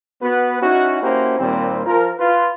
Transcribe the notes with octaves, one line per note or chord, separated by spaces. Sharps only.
B3 F#4 B4
C#4 D#4 E4 F#4
A#3 C#4 E4 F#4 G4 C5
D#2 A#2 G3 C4
F3 F4 A#4
F4 B4